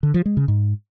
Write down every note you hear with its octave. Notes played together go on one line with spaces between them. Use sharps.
D3
F3
G#3
C#3
G#2